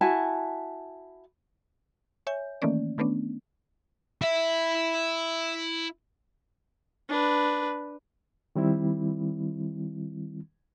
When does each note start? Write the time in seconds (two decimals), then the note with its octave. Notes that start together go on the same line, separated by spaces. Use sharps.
0.01 E4 F#4 G#5 A5
2.27 C#5 E5 G#5 G6
2.62 D#3 E3 A3 A#3 C#4 D5
2.98 D#3 A3 B3 C#4 D4
4.22 E4 E5
7.09 D4 B4
8.56 D#3 G3 C4 E4